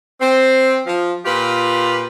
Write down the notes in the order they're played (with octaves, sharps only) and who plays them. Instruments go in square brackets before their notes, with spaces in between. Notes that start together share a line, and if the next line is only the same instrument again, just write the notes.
[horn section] C4
F3
A#2 F4 G4 B4